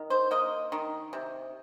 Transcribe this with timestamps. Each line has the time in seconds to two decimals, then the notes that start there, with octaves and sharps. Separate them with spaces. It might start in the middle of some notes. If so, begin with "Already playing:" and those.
Already playing: D#3
0.10 C5
0.31 A#3 D#5
0.72 D#3
1.13 C3